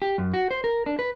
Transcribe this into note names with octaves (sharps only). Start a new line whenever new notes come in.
G4
F#2
F#4
C5
A#4
D4
B4